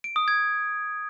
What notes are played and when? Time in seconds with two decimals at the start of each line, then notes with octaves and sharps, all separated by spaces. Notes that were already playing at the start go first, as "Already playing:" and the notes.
0.04 D7
0.16 D#6
0.28 G#6